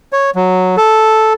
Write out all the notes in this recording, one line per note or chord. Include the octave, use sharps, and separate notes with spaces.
C#5
F#3
A4